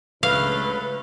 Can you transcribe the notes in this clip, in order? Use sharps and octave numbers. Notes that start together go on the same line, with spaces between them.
C#2 D3 F#3 A3 B4 F5